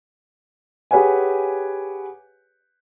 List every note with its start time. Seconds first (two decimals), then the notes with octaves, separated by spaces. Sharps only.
0.91 G4 G#4 B4 C#5 F#5 G#5